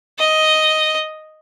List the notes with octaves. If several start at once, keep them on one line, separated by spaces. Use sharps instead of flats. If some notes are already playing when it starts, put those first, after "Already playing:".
D#5